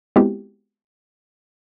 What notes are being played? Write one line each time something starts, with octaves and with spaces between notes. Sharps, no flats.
G#3 B3 C4 E4 F#4 G4